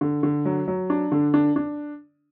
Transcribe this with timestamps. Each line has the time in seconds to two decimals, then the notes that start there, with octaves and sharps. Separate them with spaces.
0.01 D3
0.23 D3
0.45 F#3
0.68 F#3
0.90 D4
1.12 D3
1.34 D4
1.56 D4